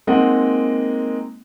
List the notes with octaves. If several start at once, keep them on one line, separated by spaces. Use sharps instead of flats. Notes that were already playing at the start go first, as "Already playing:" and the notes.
G#3 A#3 C4 D#4 D#5 F#5